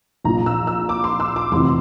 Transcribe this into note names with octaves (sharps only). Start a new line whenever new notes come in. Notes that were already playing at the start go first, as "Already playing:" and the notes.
A#1 A#2 F3 A#5
E6
E6
D6
C6
E6
D6
F1 E2 C3 E3 C6